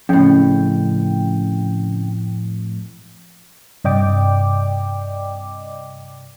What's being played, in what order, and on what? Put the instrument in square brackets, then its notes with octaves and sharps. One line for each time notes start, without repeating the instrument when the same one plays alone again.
[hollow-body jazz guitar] F2 A2 [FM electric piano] C#3 G5
[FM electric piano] G2 C3 D5 D#5 G5 D6